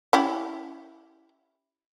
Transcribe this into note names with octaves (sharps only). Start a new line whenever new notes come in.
C#4 E4 G4